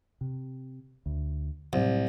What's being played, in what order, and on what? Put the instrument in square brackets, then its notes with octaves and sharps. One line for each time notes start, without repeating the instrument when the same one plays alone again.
[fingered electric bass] C3
D2
[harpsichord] C2 [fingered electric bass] A2 F#3